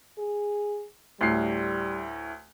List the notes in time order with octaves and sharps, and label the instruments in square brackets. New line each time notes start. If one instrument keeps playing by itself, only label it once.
[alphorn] G#4
[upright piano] D2 A2 C7 [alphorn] G3